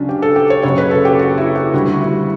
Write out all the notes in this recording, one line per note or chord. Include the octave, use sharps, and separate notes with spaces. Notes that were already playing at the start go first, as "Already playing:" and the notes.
Already playing: C#2 C#3 F#3 C#4 D4
G4
A4
G4
C#5
F#1 F#2 C#3 F#3 C#5
B4
A4
G4
F#4
E4
G4
D2 D3 G3 F#4
F#4
E4